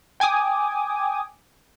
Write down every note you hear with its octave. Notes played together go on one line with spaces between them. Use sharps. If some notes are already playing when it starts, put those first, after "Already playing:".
G5 G#5 D6 D#6